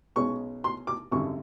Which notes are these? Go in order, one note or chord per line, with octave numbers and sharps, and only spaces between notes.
B1 B2 G#3 C#4 C#6
C6
D6
G#1 F#2 D3 G3 C#6